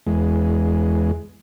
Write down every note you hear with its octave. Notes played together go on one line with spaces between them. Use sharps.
E2 G#3